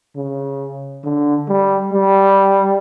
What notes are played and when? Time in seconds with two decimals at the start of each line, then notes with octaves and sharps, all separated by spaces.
0.16 C#3
1.04 D3
1.48 G3
1.92 G3